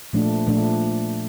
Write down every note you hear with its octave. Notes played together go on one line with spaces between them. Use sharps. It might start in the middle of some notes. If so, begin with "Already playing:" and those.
A#2 F3 A3 D4
A#2 F3 A3 D4